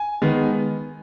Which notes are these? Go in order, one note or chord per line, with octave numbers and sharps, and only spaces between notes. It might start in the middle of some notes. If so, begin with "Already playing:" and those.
Already playing: G#5
D#3 G#3 B3